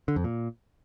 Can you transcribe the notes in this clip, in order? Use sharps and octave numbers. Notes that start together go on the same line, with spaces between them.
D3
F2
A#2